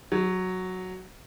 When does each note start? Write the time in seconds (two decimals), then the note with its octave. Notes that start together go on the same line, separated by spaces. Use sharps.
0.12 F#3